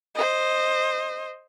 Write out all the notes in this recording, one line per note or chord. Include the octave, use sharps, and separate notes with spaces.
C5 D#5